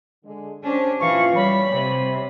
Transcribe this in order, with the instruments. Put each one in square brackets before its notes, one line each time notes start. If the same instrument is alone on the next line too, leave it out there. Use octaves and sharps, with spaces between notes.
[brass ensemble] D3 G#3
[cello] C#4 D4 [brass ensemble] G4 C5
[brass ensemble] A#2 F4 [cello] E3 F5 [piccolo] C#6
[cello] G3 [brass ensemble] C#5 [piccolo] B5
[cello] C3